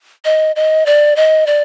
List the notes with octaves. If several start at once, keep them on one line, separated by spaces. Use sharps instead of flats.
D#5
D#5
D5
D#5
D5